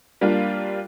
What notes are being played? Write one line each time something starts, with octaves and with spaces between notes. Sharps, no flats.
G3 A#3 D4 F4